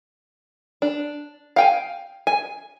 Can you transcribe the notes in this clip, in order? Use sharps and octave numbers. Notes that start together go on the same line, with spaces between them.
D4
F5 G5 G#5
G#5